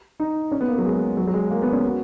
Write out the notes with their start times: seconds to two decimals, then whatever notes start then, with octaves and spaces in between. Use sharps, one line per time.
0.20 D#4
0.52 C#4
0.61 B3
0.68 A#3
0.78 F#3
0.85 G#3
1.17 F#3
1.27 F#3
1.34 G#3
1.51 A#3
1.62 B3
1.72 C#4
1.84 F#4